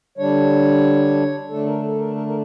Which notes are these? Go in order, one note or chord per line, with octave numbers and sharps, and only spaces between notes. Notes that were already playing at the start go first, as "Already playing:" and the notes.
D3 G3 D4 C#5
D3 A3 D4 A4
A#4
A4
A#4
A#4
A#4